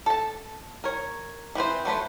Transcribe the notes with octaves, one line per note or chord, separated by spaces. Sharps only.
A4 A5
A#4 C#5
E3 C4 B4 C5
F#3 A3 B4 C5